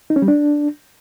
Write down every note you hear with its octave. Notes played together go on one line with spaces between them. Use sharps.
D#4
C#4
G3
D4